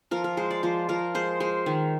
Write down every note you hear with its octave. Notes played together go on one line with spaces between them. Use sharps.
F3 A#4
A#4
G#3 C5
D5
F3 C5
F3 A#4
G#3 C5
G#3 C5
D#3